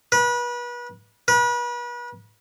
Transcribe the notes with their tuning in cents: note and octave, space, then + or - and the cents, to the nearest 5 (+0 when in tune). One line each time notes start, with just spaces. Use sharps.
B4 -30
B4 -35